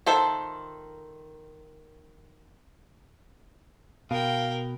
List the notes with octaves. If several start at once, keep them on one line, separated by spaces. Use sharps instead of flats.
D#3 F4 A4 C5 E5
B2 A#4 F5 G5